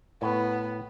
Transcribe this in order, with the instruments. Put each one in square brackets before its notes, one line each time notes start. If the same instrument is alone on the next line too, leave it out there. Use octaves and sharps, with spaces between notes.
[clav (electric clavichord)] A2 [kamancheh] B3